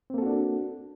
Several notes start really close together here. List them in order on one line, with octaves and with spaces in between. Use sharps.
C4 A#3 A4 F#4 D4